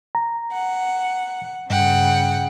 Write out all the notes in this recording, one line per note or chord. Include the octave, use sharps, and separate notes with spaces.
A#5
F#5
G2 C#3 F#5 G5